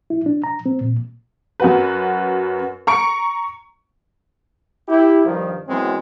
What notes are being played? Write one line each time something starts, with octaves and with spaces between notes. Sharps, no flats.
E4
D4
A#5
C4
A#2
F#2 F#4 B4
A#5 C#6 C#7 D7
E4 G4
G2 D#3 F3
F#2 E3 F#3 G#3 B3 C4